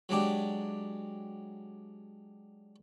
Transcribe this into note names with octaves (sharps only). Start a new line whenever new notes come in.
F#3 G#3 D4 G4